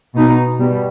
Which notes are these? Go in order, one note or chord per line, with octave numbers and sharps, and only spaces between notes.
B2 B3 D#4
B2 G3